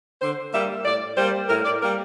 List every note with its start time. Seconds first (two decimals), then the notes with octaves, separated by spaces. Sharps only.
0.22 D3 C5
0.54 G3 A#3 E5
0.85 A2 D5
1.18 G3 A#3 C5
1.49 A2 A#4
1.65 D5
1.82 G3 A#3 A#4